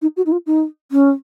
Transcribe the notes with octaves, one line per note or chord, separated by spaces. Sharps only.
D#4
F#4
D#4
F4
D#4
C#4